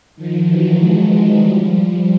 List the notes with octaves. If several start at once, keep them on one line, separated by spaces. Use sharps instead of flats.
D#3 F3
E3 F#3
F#3 G#3
F#3 G#3
F3 G3
F3 G3